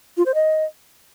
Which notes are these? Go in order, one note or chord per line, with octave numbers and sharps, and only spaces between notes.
F4
C5
D#5